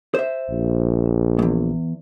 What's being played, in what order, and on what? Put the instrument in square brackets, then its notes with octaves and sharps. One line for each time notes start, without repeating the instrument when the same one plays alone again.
[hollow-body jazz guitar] C5 E5
[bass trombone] A#1
[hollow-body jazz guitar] E2 G#2